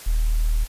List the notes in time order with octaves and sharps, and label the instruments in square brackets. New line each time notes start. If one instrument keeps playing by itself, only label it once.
[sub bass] D#1